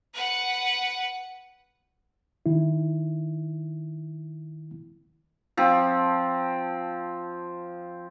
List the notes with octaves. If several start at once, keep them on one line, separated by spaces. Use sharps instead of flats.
B4 F#5
D#3 E4
F3 C4